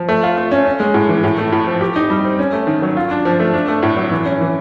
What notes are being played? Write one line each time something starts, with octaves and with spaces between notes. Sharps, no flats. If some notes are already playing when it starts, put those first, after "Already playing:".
Already playing: F3
A3
F4
A3
C#4
C#4
G#3
A2
E3
A2
A3
A2
F3
G4
D#4
G3
C4
C#4
A3
D#3
F#3
F4
D4
F3
A3
D4
A3
A2
F#3
E3
C#4
E3